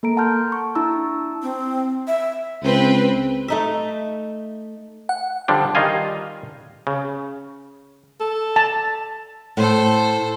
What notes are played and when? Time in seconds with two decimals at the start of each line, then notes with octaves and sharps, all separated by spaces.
0.03 A#3 A4 A#5 D7
0.17 F#5 A5 A#5 C6 F6 G6
0.52 C#6
0.75 D4 E4 A5 A#5 E6
1.42 C4
2.08 E5
2.63 C#2 C4 B4
3.48 A3 D#4 E5
5.09 F#5
5.48 D3 F3 G3 D4
5.75 D#3 G3 F4 D#5 F5 G#5
6.87 C#3
8.20 A4
8.56 A5
9.57 A2 A4 C5